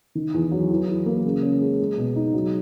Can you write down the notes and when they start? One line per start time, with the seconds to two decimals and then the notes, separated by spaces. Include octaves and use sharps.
0.15 D#3
0.34 E2
0.52 F#3
0.70 E3
0.88 E4
1.06 A#3
1.24 C#3
1.43 C#4
1.61 G#3
1.79 G#3
1.98 B2
2.16 D#4
2.34 F#3